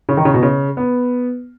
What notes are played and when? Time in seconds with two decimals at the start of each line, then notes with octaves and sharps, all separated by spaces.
0.09 C#3
0.17 D#3
0.25 C#3
0.34 B2
0.43 C#3
0.77 B3